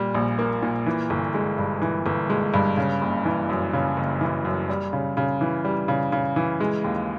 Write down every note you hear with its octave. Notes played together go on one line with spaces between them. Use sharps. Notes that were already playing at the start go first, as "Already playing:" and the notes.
Already playing: A#2 G3
A#1
A#3
A#2
E3
G1
G#3
G2
E3
G1
G#3
G2
C#3
F#1
E3
F#2
C#3
F#1
E3
F#2
G3
C#3
C#3
E3
G3
C#3
C#3
E3
G#3
D#2